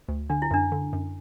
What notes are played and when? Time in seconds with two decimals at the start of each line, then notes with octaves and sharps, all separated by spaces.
0.08 D2
0.30 D3 D4
0.42 E4
0.51 F#2 D4
0.72 D3
0.93 F#2